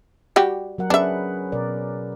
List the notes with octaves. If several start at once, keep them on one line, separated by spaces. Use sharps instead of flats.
G3 F#4 G4
F#3 A#4 F#5
C#4 D4 G#4 B4 E5
B2 A#4 D5